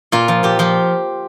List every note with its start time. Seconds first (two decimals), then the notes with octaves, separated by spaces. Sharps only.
0.12 A#2 F4
0.28 F3
0.43 A#2 G4
0.59 F3 G4